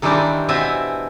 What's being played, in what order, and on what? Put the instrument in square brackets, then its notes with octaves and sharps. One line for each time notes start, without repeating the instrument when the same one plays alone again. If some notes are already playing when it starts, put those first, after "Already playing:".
[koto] D#3 E3 G3 C4 D4 D#4
B2 C4 E5 G#5